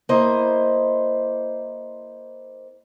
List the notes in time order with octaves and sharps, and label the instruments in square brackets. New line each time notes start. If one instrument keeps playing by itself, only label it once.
[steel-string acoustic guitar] A#3 E4 C5 D#5